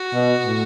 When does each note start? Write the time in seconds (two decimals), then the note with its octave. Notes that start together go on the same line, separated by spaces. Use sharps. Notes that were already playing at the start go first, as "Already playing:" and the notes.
Already playing: F#4
0.14 B2
0.44 A2